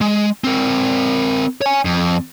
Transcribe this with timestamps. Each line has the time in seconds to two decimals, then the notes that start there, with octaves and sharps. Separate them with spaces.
0.01 G#3
0.44 C4 A#4
1.61 C#5 G#5
1.85 F2